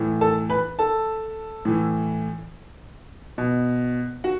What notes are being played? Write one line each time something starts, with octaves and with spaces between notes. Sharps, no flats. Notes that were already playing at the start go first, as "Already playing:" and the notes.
Already playing: A2 E3
A4 A5
B4 B5
A4 A5
A2 E3
B2
F#4 F#5